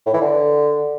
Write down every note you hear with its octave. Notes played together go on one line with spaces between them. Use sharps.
A2
E3
D3